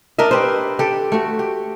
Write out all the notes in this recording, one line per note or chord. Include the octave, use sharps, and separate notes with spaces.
D4 A#4 D#5 E5
G4 B4 C5
G4 A4
A3 F#4
G4